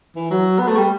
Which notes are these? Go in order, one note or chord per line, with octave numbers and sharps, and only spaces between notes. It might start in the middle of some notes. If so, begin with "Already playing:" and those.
E3
F#3
B3
A3
G3